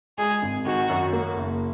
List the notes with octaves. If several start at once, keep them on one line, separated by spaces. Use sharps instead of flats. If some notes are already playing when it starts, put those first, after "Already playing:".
G#3 G#4
G#1
D#3 F#4
F#2
A#3
F#1